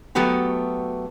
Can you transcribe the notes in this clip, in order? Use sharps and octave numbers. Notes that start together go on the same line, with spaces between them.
F#3 A3 B3 F#4 G4